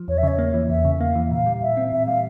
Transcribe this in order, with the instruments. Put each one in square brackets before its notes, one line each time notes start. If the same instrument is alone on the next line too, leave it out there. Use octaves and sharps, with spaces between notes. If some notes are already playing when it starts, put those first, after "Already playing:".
Already playing: [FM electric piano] F3
[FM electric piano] E2 [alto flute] C#5
[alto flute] E5
[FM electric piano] C#3 [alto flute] C#5
[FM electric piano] A#3
E3
[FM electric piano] E2 [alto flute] E5
[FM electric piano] C#3
[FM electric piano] A#3 [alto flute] F5
[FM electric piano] E3
[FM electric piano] A#2 [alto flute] F5
[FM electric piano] G3
[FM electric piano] A#2 [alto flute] E5
[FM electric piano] C4
[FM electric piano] A#2 [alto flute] E5
[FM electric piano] G3 [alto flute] F5